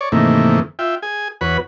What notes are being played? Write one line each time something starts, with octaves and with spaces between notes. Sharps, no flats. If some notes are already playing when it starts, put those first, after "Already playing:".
C#5 D5
G#2 C3 D#3 E3 A3 A#3
F4 E5 G5
G#4 G#5
E2 F#4 B4 C#5 B5